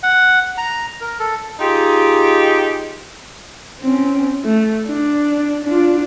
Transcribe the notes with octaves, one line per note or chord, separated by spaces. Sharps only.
F#5
A#5
A#4
A4
D#4 F4 G4 G#4
C4 C#4
A3
D4
D4 F4